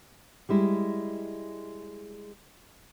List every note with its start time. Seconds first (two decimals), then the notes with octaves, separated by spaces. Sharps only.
0.49 G3 G#3 E4